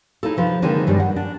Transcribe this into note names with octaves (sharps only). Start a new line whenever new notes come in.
D#4 E4 G#4 A4
C3 F3 B4
D3 D#3 F3 G#3 A#3 C4
G2 B2 D#3 G3 G#3 D5
F#5
D4